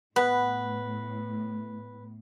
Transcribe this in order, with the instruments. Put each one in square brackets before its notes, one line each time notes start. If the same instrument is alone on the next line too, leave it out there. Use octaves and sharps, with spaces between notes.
[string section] A2 [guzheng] B3 [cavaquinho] B4